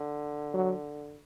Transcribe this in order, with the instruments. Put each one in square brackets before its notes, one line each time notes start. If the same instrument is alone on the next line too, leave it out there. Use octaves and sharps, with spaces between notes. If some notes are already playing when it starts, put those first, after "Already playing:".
Already playing: [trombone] D3
[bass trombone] F#3